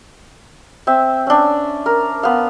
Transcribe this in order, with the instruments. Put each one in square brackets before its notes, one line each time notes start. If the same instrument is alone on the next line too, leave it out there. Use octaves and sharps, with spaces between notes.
[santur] C4 E5
C#4 D4
A#4
B3 F5